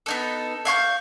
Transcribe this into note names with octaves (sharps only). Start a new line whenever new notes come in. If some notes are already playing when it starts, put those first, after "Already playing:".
B3 D#4 A4
E5 F5 C#6 G6